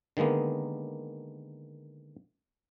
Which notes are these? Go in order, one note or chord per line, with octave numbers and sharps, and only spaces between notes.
D3 D#3 G#3 A#3 B3